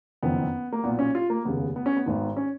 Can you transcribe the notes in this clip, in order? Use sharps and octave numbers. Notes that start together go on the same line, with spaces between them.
F#1 F2 D#3 B3
A#3
B1 A#2 B3
C#4
F4
A#3
F1 D#2 C#3 B3
B3
C#4
B3
G#1 G#2 D#3
C#4